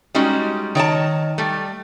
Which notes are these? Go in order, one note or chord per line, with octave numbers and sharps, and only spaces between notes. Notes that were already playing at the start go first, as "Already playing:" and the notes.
G3 G#3 C#4 D#4 F#4
D#3 C#5 D#5 A5
G3 A3